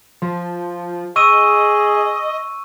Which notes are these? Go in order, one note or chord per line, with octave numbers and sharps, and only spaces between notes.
F3
G#4 D#5 C#6 E6 D#7